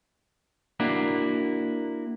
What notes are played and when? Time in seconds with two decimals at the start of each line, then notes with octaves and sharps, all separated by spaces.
0.80 A#3 D4 E4 F#4